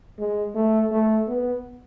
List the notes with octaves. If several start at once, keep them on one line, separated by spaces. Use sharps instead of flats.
G#3
A3
A3
B3